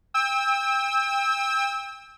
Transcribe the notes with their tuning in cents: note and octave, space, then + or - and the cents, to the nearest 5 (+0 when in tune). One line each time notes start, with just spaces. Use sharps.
G5 +30 E6 -20